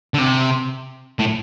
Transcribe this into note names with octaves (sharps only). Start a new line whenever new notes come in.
D3
C3
A2